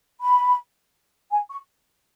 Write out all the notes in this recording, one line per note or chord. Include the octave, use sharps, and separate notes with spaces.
B5
G#5
C#6